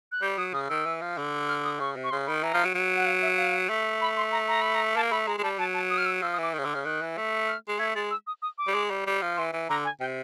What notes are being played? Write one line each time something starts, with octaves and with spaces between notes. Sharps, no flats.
F#6
G3 G6
F#3 D#6
C#3 D#6
D#3 E6
E3
F3
D3
F6
D#6
C#3 C#6
C3
C#6
C#3 C6
D#3 B5
E3 A#5
F3
F#3
F#3
F#5
F5
E5
F5
A3
B5
C6
A#5
A#5
B5
A#5
A#3 A5
A3 B5
G#3 A#5
G#3
G3 A5
F#3 A5
A5
D#6
F6
E6
F3 E6
D#6
E3 D6
D#3
C#3
D3 E6
C#3 F6
D#3 F#6
E3
A3
F6
G#3
A3 G#6
G#3 A6
E6
D#6
D#6
D6
G3
G#3
G3
G3
F3
E3 C6
E3
D3 A#5
G#5
C3 G5